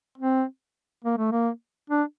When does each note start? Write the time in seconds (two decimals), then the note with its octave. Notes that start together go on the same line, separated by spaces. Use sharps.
0.18 C4
1.04 A#3
1.17 A3
1.31 A#3
1.90 D4